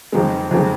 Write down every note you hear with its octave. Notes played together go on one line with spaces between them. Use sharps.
F2 D#3 G#3
F2 D#3 G#3